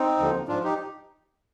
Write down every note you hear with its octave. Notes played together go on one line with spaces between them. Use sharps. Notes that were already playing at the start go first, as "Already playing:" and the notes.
Already playing: C4 D#4
D#2 D3 F3
G#2 F3 D4 F4
D#4 G4